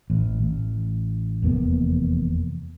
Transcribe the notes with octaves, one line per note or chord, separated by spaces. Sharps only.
A1
A1
F1 E2 A#3 B3